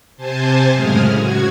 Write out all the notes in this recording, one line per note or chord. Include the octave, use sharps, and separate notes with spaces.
C3 C5 G#5 A5
F#2 A2 C#3 G#3 D#6 F6
F#4 G#6